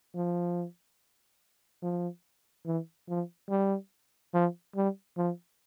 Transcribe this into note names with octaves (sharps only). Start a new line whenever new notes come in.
F3
F3
E3
F3
G3
F3
G3
F3